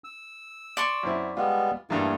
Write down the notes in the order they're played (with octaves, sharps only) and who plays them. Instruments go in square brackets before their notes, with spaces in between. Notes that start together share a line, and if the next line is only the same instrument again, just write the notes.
[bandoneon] E6
[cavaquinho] D5 C6 C#6
[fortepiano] F#2 C4 E4
[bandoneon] G3 G#3 B3 [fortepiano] F4
[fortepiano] E2 G2 [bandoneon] G3 A3 A#3